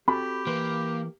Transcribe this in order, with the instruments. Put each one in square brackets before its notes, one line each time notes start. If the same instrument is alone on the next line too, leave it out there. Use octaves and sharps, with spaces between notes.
[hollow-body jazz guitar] C4 F#4 A4 [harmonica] G4 [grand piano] B5
[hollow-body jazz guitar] E3 B4 C6 [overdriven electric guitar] A#3